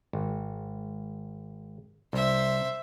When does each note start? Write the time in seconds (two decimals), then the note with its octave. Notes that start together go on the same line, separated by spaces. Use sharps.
0.13 G#1
2.13 C2 C5 E5